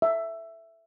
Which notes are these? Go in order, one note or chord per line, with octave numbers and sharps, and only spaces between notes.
E5